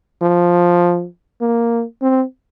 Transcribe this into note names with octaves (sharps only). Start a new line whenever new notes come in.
F3
A#3
C4